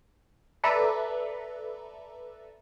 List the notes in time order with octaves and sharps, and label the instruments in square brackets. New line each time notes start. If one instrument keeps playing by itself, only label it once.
[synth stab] A4 B4 D5 E5 A#5